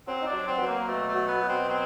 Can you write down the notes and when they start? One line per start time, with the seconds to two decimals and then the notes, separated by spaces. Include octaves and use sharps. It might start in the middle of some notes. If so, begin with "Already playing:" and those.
0.06 F#3 C4
0.22 D#4
0.26 D4
0.33 F#3
0.47 C4
0.58 F#3 B3
0.66 A#3
0.87 B2 A3
1.07 A3
1.14 F#3
1.27 B3
1.41 B2
1.48 C4
1.68 F#3 C4